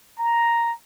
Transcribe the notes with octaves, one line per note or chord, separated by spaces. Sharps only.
A#5